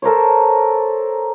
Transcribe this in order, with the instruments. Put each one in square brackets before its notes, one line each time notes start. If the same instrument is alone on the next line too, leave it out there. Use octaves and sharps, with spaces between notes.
[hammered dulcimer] A4 A#4 C5 C#5